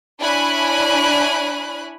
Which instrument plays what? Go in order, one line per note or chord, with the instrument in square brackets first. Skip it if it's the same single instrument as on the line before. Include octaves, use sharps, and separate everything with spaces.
[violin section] D4 E4 C#5 G#5 B5 F#6